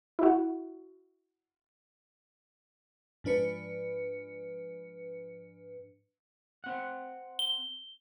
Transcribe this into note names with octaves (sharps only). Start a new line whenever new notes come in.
E4 F#4
G#2 F3 D4 B4 C#7
C4 F#5
G7